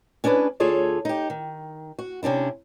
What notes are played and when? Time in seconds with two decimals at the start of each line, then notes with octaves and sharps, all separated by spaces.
0.24 C#4 D4 G#4 A#4 B4
0.60 D2 F4 G#4 A4 C#5 D5
1.05 D#4 G4
1.30 D#3
1.99 F#4
2.23 C3 C#4 D4 E4